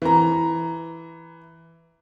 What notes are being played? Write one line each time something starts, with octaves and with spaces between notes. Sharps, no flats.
E3 A#5